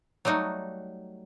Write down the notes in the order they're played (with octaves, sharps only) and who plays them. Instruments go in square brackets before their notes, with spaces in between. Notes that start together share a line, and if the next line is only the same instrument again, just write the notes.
[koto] F#3 G3 A3 D#4 F#4